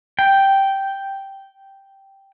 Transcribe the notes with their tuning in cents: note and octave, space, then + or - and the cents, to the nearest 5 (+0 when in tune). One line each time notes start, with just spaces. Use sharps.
G5 -5